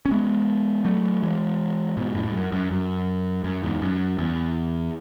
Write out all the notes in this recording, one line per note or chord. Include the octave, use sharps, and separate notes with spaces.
C#4
G#3 B3
F#3 A3
E3 G#3
G#2 B2
F#2 A2
G#2
F#2
F#2
F#2
F#2
E2 G#2
F#2
E2